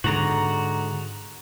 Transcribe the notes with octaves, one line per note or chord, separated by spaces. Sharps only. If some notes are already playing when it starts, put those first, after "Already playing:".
G#2 D3 F#4 A#5